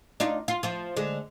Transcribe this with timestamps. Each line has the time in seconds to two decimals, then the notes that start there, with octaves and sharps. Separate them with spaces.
0.20 D4 D#4 F4
0.48 F4
0.63 F3 F4
0.97 D3 G#3